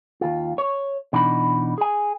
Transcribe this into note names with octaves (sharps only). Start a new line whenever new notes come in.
D#2 F4
C#5
B2 E3 D4 D#4 B5
G#4 G#5